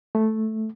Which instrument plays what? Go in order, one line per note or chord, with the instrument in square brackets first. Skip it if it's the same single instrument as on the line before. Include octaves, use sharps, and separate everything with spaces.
[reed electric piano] A3